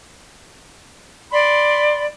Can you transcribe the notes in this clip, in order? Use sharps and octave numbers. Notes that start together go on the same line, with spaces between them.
D5 B5 C6